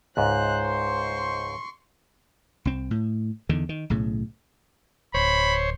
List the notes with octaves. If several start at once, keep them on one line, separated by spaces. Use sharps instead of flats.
C#2 G#2 C5 F#6
C6 C#6
C2 C4
A2
E2 D3 D#3
D#3
B1 A2 C#3
D1 C5 C#5 B5